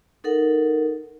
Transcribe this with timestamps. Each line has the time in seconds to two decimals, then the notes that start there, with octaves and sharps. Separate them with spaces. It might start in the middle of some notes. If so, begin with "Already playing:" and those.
0.24 D#4 A4 A#4 F#5